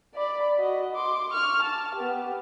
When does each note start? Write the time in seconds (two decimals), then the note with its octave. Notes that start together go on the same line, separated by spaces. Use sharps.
0.15 D5 B5
0.59 F#4 D#5
0.95 C6 D6
1.30 C#6 F6
1.62 A5
1.94 B3 G4